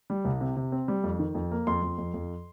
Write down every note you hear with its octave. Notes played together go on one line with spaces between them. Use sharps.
G3
C2
C3
C3
C4
G3
F2
D#3
F2
A#3
F2 C6
F2
F2
F2